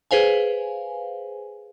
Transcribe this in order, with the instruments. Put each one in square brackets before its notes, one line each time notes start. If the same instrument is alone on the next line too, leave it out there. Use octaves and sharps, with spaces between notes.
[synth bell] G#4 B4 C5 F5 G#5